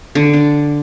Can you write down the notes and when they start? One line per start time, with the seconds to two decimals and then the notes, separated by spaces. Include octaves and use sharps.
0.15 D3
0.33 D4